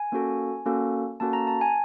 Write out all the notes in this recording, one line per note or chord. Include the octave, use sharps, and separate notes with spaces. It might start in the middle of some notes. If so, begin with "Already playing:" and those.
Already playing: G#5
A#3 C#4 F#4 A4
A#3 C#4 F#4 A4
A#3 C#4 F#4 A4 A5
A#5
A5
G#5